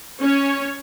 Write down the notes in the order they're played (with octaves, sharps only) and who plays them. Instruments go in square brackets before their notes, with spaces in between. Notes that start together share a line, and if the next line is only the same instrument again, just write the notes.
[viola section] C#4 C#5